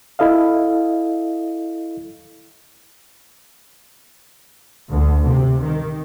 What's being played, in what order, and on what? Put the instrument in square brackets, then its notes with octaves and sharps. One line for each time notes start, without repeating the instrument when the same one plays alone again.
[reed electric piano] E4 A4 D#5 F5
[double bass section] D2
C3
D#3